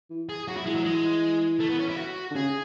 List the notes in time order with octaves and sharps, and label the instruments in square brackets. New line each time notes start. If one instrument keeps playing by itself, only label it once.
[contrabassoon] E3
[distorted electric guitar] G#4
[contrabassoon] F#3 [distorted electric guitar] F#4
[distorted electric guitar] E4
[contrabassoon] E3 [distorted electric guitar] G#3
[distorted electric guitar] F#3
[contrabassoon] E3 [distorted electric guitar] G#3
[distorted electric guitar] A3
B3
C#4
E4
F#4
[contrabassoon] D3
[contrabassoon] C#3 [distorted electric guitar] G#4